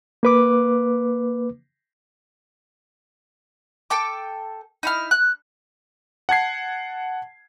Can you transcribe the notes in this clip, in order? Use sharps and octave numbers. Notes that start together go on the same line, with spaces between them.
A#3 B4 D6
A4 G5 D6
D#4 E4 F6
F#6
F#5 A5 G#6 C7